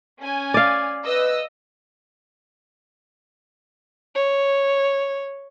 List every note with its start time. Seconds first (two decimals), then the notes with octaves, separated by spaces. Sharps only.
0.20 C#4 G#5
0.54 D5 F5
1.06 B4 D#5 E6
4.15 C#5